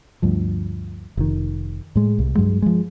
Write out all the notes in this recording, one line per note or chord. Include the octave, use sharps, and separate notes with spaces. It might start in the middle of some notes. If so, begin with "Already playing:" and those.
D2 G2 F3
F1 D#3
A2 G#3
C2
G2 F#3 G#3
F3 G#3